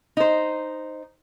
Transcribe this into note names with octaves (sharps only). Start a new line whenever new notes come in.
D#4 C5